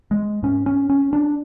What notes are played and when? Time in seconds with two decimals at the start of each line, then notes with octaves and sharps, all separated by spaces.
0.11 G#3
0.43 G#2 C#4
0.66 C#4
0.90 C#4
1.13 D4